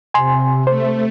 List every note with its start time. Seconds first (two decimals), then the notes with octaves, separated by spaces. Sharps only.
0.14 C3 G#5 C6
0.67 A3 C5